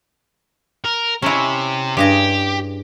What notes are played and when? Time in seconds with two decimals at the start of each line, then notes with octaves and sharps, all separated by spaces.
0.84 A#4
1.22 C3 C#4 E4
1.97 G2 G4 G#4 A#5